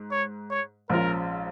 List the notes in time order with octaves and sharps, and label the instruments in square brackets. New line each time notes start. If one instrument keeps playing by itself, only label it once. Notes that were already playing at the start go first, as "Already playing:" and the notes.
Already playing: [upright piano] G#2
[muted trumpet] C#5
C#5
[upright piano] A#1 G#2 F3 C#4 F4 [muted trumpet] A#4